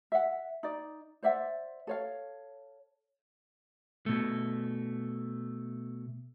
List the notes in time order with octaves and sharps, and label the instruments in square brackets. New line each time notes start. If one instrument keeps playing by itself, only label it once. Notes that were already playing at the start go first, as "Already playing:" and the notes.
[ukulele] E5 F#5
D#4 D5
C5 D5 E5 F#5
A4 C#5 F5
[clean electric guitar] B2 A3